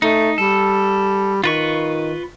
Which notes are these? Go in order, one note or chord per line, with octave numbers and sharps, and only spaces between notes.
A3 D#4
G3 A4
D#3 F4 B4 C#6